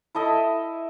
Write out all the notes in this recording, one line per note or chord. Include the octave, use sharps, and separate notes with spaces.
E4 A4 D#5 E5